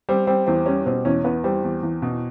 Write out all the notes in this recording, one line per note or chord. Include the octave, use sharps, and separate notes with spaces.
G3 C4
G3 C4
E2 C4
G3 C#4
B2 C4
E2 C#4
E2 B3
G3 C4
E2
E2
B2